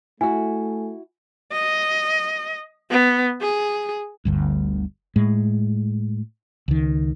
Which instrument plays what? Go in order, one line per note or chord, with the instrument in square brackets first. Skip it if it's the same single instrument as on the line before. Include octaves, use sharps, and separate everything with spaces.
[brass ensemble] A3 [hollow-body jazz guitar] E4 F#4 [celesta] G#5
[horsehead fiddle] D#5
B3
G#4
[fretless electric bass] G1 D2 G2
A2 G#3
C#2 D#3